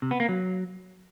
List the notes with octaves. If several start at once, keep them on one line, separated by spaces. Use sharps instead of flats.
C3
B3
A#3
F#3